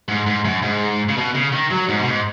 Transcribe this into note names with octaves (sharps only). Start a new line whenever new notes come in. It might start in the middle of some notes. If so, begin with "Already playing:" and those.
G#2
G#2
F#2
G#2
C#3
B2
C#3
D#3
F#3
G#2
B2
G#2